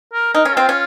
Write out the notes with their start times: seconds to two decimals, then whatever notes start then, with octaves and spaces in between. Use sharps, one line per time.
0.13 A#4
0.34 D#4 A#4
0.45 C#4
0.54 C4 F4
0.69 C#4